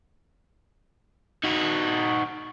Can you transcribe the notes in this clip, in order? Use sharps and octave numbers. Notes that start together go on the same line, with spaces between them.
D#3 F#4